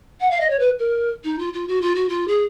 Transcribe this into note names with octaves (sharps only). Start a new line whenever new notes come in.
F#5
F5
D#5
C#5
B4
A#4
D#4
F4
F4
F#4
F4
F#4
F4
G#4